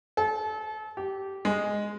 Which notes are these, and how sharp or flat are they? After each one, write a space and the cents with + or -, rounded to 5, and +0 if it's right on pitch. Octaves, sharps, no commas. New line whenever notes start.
A4 -35
G4 -15
G#3 -5